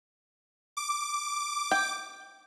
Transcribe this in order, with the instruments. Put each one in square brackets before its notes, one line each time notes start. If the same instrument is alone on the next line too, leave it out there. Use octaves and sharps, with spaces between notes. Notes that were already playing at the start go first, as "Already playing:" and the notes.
[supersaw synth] D6
[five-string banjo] G5